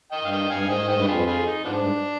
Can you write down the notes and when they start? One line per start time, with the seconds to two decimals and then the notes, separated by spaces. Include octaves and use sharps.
0.12 D#5 G5
0.22 G2 F5
0.31 D#5 G5
0.50 G2 F5 G#5
0.60 F5
0.65 G#2 D#5 G5
0.79 G#2
0.89 G2 D#5 G5
1.01 B4
1.08 F2 F4 G#4
1.19 B4
1.27 F4 G#4
1.46 D#4
1.64 G#2 F3 B3 D4
1.79 G2